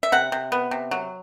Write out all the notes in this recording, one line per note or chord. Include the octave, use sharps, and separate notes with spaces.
E5
C3 F#5
C3
B3
C3
F#3